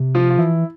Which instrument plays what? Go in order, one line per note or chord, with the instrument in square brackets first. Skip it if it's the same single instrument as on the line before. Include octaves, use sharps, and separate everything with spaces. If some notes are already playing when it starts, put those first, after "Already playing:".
Already playing: [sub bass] C3
[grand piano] F3 F4
F4
[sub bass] E3 [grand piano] E4